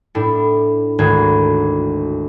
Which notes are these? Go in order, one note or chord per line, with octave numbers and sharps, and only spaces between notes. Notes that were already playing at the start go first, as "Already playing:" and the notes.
A2 D4 E4
G#1 D2 G#2 G#6